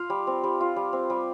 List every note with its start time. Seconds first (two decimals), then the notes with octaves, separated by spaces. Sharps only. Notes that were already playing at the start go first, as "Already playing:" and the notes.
Already playing: F4 F5
0.10 G3
0.27 C4
0.44 G3
0.60 F4
0.76 G3
0.93 C4
1.10 G3